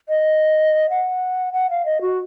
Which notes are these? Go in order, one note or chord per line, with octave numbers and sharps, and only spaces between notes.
D#5
F#5
F#5
F5
D#5
F#4